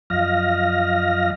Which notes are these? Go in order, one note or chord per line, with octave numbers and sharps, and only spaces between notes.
F#2 F3 D#5 F5 F6 A#6